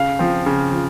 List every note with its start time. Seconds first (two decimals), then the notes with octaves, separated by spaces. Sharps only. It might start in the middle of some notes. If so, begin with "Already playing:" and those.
Already playing: C#3 F5
0.19 F3 C4
0.46 C#3
0.72 F3